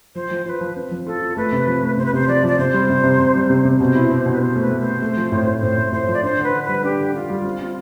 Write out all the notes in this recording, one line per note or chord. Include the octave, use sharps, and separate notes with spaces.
F3 C5
F3
F4 B4 C5
F3
C4
F3
F4 A4
F4
A3 B4
C3
F3
A3
C3 C5
B4
C3 C5
F3 D5
F3 D5
C3 C5
G3
C3
C3
C3
G3
C3
C3
B2 C5
E4
C4
B2
B4
C4 C5
A3
B4
A3
C5
C4
A3
F3
A2
A2
A2 C5
A2
A2 C5
F3
D5
D4 C5
D3
B4
D3
G3 B4
D4 G4
D3
D4 F4
G3
C4
C4